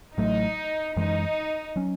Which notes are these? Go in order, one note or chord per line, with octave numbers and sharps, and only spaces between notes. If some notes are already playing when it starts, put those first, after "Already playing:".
A1 A2 F#3 A3 D#4
F#2 E3 G#3 D#4
F#3 C#4